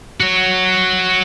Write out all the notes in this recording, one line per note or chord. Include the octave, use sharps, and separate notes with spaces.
F#4 C#5